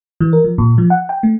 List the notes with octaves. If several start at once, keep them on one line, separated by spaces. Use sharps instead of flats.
E3
A#4
F3
A#2
F3
F#5
G5
A3